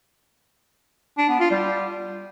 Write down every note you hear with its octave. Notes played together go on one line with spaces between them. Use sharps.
D4
B3
F4
G3